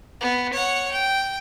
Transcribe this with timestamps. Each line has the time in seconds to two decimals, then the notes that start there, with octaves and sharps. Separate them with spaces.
0.21 B3
0.53 C#5 F#5
0.91 G5